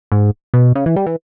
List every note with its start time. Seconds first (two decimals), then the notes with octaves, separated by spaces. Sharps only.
0.12 G#2
0.54 B2
0.75 C#3
0.86 E3
0.96 G3
1.07 E3